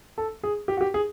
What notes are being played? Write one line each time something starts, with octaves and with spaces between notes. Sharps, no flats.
A4
G#4
G4
F#4
G4
G#4